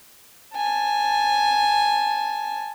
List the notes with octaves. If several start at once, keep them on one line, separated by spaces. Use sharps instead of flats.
G#5 A5